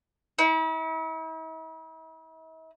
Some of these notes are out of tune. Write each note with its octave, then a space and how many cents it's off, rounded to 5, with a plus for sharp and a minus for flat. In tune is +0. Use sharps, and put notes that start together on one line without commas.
E4 -45